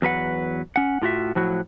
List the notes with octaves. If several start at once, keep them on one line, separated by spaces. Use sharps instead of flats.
E2 F#3 B4 F#5
C#4 F#5
A2 F4 F#4 E5
A2 F3 F#3 E4 F#4